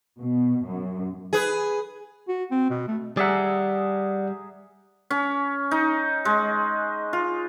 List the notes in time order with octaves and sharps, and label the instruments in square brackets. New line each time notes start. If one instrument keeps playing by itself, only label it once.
[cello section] B2
F#2
[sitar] G#4 B4
[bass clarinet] F#4
C4
B2
A3
[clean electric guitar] G3 [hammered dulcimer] G#4 E5 A#5 [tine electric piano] D5 F#5
[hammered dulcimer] C#4
D#4
G#3
F4